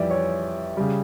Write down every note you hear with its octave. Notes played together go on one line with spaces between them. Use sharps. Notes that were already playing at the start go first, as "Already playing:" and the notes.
Already playing: F2 E3 G3 D5 E5
C#5
C#3 G3